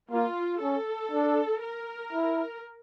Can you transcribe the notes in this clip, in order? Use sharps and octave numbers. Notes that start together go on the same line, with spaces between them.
A#3 F4
C#4 A4
D4
A#4
E4